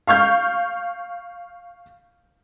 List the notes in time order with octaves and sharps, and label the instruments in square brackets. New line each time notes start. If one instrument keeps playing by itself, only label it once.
[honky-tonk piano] F5 C#6 F6 G6